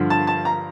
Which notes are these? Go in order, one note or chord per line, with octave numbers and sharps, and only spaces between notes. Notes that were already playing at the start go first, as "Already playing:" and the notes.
Already playing: G2 D3 F3
A5
A5
A#5